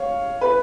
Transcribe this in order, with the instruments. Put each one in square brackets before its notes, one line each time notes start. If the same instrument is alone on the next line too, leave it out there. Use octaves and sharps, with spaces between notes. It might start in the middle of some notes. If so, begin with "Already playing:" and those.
Already playing: [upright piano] C#5 F5
B4